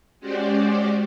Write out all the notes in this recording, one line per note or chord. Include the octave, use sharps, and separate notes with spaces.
G#3 C#4 F#4 G4 C5 D5